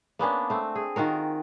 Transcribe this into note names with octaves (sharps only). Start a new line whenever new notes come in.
A#3 B3 C#4 D4
A3 C4
G#4
D#3 F4 F#4 A#4